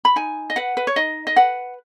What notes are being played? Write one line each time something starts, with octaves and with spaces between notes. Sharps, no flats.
B5
D#4 G#5
D#5
B4 F#5
B4
C#5
D#4 D#5
D#5
B4 F#5